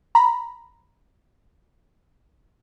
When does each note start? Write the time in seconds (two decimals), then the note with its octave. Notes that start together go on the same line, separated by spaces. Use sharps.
0.15 A#5 B5